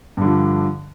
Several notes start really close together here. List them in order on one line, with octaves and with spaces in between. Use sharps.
G2 D3 F3